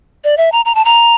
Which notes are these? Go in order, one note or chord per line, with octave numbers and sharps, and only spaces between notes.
D5
E5
A#5
A#5
A5
A#5